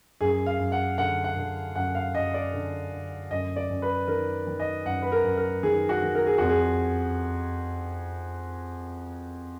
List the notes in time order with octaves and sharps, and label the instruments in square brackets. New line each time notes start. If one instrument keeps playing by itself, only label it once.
[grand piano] F#2 G#4
F5
F#2
F#5
D3 F#5
F#5
D3
F#2 F#5
F5
F#2 D#5
D5
D3
D3
F#2 D#5
D5
F#2
B4
D#3 A#4
D#3
D#5
F#2 F#5
B4
A#4
F#2
A#4
D#3 G#4
F#4
D#3
A#4
G#4
F2 F#4
G#4